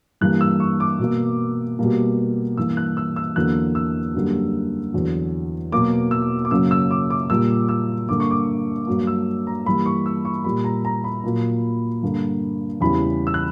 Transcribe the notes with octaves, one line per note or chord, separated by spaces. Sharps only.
G2 E3 G3 A#3 F#6
E6
C#6
D6
B2 A#3
B2 G3 A#3
G2 E3 A#3 E6
F#6
E6
E6
E2 D3 F#3 A#3 F#6
E6
F#2 D3 G3 A#3
E2 D3 F#3
B2 F#3 A#3 D6
E6
D6
F#2 C#3 F#3 A#3 E6
E6
D6
D6
A#2 G3 A#3 E6
E6
G2 D3 A#3 D6
C#6
D6
G2 F#3 A#3
E6
A#5
G2 E3 G3 A#3 B5
C#6
E6
C#6
A#2 G3 A#3 B5
A#5
A#5
B5
A#2 F#3 A#3
G2 D3 A#3
E2 C#3 E3 G3 B5
E6
F#6